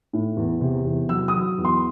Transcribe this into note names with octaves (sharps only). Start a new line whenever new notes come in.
A2
E2
C3
E2
F#3 E6
D#6
F#3
E2
C6